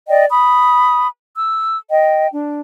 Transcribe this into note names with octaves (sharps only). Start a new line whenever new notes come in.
D5 D#5 G5
B5 D#6
E6
D#5 G5
D4